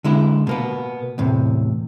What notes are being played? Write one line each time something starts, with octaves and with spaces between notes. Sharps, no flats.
D3 G#3 E4
B2 A#3 B3
E2 A2 C3